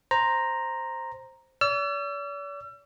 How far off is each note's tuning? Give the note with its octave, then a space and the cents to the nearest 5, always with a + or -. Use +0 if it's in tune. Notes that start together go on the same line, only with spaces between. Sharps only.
C5 +0 A#5 +0
D5 -45 E6 +40